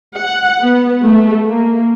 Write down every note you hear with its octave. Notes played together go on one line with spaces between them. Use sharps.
F#5
B3
A3
A#3